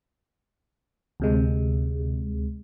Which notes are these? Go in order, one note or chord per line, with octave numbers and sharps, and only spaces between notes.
D2 C3 G#3